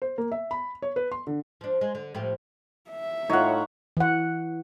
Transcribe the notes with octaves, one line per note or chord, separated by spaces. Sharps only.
C5
A#3
E5
B5
C#5
B4
C6
D3
F3 D4
G#3
D3
A2 F3 G4
E5
A2 D#4 F4 C#5 F#5
E3 F#5